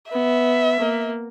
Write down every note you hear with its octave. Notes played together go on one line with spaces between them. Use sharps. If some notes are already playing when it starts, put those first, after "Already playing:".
B3 E5
A#3